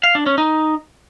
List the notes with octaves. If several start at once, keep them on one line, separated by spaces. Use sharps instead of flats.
F5
D4
C#4
D#4